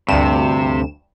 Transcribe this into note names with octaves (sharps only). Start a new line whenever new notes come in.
D2 G2 C3 E7